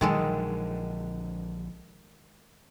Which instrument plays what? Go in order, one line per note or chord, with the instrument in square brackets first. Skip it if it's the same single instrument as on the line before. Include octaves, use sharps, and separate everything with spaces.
[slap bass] A#1 D3 F#3 [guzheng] D#3 G#3 A4